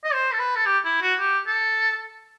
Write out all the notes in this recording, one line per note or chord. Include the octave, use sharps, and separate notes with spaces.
D#5
C5
A4
B4
A4
G4
E4
F#4
G4
A4